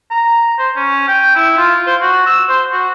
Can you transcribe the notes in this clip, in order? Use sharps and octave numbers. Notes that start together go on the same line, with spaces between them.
A#5
C5
C#4
G5
E4
F4
C5
F#4
E6
C5
F#4